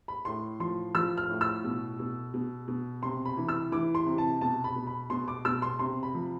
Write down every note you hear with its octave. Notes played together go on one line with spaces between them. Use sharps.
B5
A2 C6
F3 C6
F3 E6
F6
A2
E6
B2
B2
B2
B2
C3 C6
B5
E3
E6
E3 D6
C6
C3
A5
B2 A5
B5
B2
B5
B2 C6
D6
B2 E6
C6
C3 C6
B5
F3